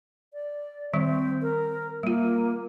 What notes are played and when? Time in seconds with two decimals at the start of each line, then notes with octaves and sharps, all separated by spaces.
0.33 D5
0.93 D#3 G3 C4
1.42 A#4
2.03 G3 A#3 F4